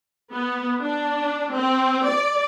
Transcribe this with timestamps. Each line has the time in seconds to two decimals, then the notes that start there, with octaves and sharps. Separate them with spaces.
0.33 B3
0.79 D4
1.53 C4
2.06 D5